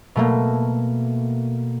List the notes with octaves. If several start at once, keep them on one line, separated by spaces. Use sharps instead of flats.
B2 A3 A#3